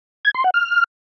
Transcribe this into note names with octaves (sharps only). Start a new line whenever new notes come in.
G#6
C6
F#5
F6